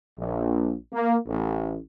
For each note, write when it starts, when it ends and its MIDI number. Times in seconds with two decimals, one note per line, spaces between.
0.18 0.73 34
0.93 1.15 58
1.27 1.77 33